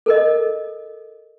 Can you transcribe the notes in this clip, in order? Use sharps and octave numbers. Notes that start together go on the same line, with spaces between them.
A4 A#4 D#5